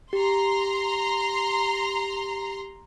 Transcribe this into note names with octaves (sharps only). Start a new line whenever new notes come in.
G4 A#5 C6